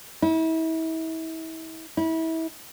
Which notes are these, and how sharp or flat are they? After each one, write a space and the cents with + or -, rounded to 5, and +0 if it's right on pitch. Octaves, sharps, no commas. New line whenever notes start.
E4 -35
E4 -30